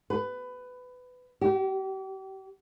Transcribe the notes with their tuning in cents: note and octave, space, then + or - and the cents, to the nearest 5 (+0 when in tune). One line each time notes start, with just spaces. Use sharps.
B4 +20
G4 -35